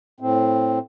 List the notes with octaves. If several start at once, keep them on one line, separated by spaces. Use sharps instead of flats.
A2 C4